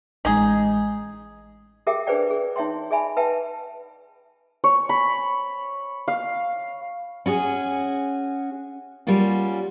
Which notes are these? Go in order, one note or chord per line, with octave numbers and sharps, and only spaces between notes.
A1 G#3 D#4 G#4
G4 G#4 A#4 E5 G5 D6
D4 G#4 B4 C5 D5 G5
G#4
D#4 C#5 E5 G5 C6
G#4 D5 E5 G#5 B5
B4 E5 G5 A5
C#5
B5
F5
C#4 F#4 G#4
G3 A#3 C#4 F4 F#4